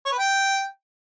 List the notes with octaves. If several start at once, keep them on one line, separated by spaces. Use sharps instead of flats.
C#5
B4
G5